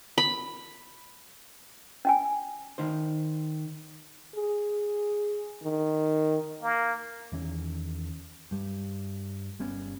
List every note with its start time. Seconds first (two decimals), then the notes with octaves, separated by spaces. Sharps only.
0.18 B5
2.05 C#4 G5 G#5
2.78 D#3 D#4 C5
4.36 G#4
5.63 D#3
6.63 A#3
7.32 E2 D#3 E3 C#4
8.51 G2 G3
9.59 G1 G3 B3 C#4